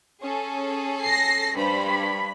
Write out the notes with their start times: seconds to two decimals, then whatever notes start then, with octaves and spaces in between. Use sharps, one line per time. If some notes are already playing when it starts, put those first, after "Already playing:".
0.22 C#4 G#4 A4
1.03 A#6 C7
1.56 G2 C5 B5